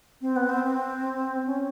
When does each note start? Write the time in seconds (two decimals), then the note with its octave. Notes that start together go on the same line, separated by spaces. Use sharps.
0.21 C4
0.36 B3
0.49 C4
0.64 C4
1.46 C#4